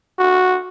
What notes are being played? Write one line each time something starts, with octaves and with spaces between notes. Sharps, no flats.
F#4